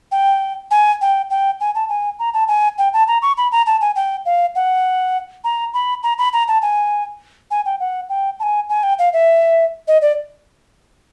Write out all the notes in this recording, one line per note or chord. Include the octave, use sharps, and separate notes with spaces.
G5
G#5
G5
G5
G#5
A5
G#5
A#5
A5
G#5
G5
A5
A#5
C#6
B5
A#5
A5
G#5
G5
F5
F#5
A#5
B5
A#5
B5
A#5
A5
G#5
G#5
G5
F#5
G5
A5
G#5
G#5
G5
F5
E5
D#5
D5